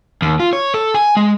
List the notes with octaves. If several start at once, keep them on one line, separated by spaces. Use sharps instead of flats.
D#2
F4
C#5
A4
G#5
G#3